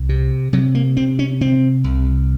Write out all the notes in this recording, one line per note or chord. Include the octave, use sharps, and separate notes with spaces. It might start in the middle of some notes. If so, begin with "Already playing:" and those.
Already playing: C2
C3
C3 F#3
A#3
C3 C4
C#4
C3 C4
C2